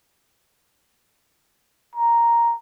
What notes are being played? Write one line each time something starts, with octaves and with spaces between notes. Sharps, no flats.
A#5